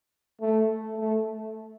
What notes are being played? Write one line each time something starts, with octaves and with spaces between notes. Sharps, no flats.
A3
A3